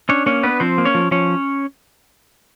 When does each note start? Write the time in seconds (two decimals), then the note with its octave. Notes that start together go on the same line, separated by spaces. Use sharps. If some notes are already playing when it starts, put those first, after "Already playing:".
0.09 C#4 D4 C#5
0.26 A#3 C#4 C#5
0.43 B3 D4 B4
0.60 F3 C4 C5
0.78 A#3
0.85 C#4 C#5
0.95 F3
1.11 F3 C#4 C#5